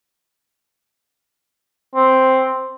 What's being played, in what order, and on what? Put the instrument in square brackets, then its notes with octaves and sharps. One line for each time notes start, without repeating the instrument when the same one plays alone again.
[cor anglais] C4